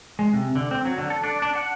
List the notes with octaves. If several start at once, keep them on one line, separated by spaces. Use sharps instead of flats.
G#3
C3
D3
C4
F#3
D3
A4
D4
D4
F#5